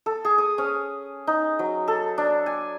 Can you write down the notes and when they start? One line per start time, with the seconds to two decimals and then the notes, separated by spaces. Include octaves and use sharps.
0.06 A4
0.25 G#4
0.38 D#6
0.58 C#4
1.27 D#4
1.59 F#3
1.88 A4
2.18 D4
2.46 G#5